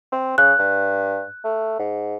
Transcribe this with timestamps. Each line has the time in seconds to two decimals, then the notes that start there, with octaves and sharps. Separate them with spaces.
0.12 C4
0.38 C#3 F#6
0.59 G2
1.44 A3
1.79 G#2